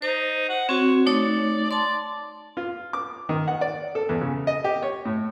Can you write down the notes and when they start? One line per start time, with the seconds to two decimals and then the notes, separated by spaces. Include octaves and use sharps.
0.02 D#4 C5
0.49 F#5
0.69 C4 F#4 C#5
1.06 A3 D#4 C#5 D5
1.71 D5 A5 C6
2.57 F4
2.93 D6
3.29 D#3
3.48 F#5
3.61 D5
3.95 A4
4.09 E2
4.21 C#3
4.47 D#5
4.64 G4
4.82 C#5
5.05 A2